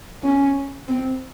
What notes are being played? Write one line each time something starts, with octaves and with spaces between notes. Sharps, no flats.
C#4
C4